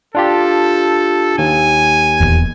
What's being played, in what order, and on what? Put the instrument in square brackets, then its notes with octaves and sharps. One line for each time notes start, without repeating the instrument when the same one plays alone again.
[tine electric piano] D4 F4 G4 [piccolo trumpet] A4
[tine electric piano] D#2 [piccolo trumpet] G#5
[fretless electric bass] D#1 G#1 E2